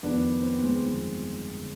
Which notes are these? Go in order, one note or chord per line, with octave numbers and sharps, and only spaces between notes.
F1 F2 D#3 B3 D4
C4
B3
G#3 C4
G1 F2 D#3
D3